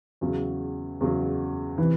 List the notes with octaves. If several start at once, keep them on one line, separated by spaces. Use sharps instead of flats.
E2 C#3 F#3
E2 C#3 F#3
C3 E3